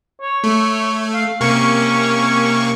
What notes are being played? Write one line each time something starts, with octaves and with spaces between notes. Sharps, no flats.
C#5
A3
F5
C3 A#3 C#4 C#6